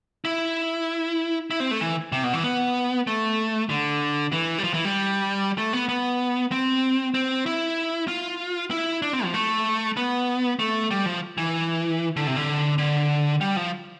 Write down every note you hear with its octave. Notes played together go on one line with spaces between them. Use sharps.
E4
E4
C4
A3
E3
C3
B2
E3
B3
A3
D3
E3
G3
F3
E3
G3
A3
B3
B3
C4
C4
E4
F4
E4
D4
C4
F3
A3
B3
A3
G3
F3
E3
D3
C3
D3
D3
G3
F3